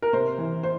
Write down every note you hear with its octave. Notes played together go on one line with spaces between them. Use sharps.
A#4
C3 C5
E3
C5